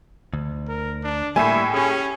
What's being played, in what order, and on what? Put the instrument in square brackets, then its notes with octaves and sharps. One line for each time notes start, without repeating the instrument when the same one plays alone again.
[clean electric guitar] D2
[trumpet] A#4
D4
[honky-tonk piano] A2 G#5 [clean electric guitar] G3 A#3 E4 [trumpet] E5
[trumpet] C#4 [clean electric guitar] G4 G#4